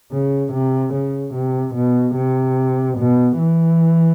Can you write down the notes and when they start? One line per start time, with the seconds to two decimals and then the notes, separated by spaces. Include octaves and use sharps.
0.12 C#3
0.52 C3
0.93 C#3
1.34 C3
1.75 B2
2.15 C3
2.98 B2
3.38 E3